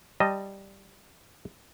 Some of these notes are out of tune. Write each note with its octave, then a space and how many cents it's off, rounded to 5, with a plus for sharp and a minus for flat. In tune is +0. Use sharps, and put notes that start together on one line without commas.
G3 +0 D#5 +0 A5 +25